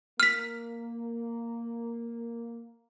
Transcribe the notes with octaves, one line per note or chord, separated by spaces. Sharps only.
A#3 F6 B6